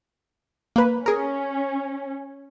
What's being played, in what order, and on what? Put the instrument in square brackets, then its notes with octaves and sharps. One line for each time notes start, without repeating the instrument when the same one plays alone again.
[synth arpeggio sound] A#3 B4
[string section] C#4 [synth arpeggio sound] G#4 A#4